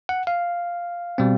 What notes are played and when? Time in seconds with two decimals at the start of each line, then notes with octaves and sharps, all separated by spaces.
0.09 F#5
0.27 F5
1.18 B2 G3 C4